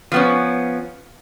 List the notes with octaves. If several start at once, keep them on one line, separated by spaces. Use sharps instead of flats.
F3 B3 C#4